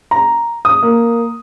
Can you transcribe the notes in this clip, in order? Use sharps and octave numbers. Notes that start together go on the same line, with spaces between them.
A#5
D#6
A#3